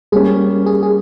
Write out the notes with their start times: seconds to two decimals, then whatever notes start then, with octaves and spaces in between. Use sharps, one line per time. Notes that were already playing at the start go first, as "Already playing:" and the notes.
0.12 G3 A#3 C#4 G#4
0.66 G#4
0.83 G#4